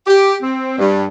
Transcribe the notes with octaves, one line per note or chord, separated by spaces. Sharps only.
G4
C4
G2